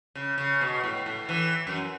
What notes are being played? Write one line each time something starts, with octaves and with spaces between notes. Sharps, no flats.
C#3
C#3
B2
A2
A2
E3
F#2